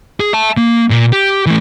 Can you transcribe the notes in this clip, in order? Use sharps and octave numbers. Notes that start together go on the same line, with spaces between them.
G#4
E5 A5
A#3
A#2
G4
E3 A3